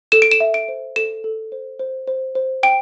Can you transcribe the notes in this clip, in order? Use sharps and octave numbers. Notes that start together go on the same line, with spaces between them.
A4 E7
D7
E7
E5
D7
C5
A4 E7
A4
C5
C5
C5
C5
G5 D7